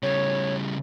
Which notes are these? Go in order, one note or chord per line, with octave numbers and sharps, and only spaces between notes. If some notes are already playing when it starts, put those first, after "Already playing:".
C#3 G3 C#5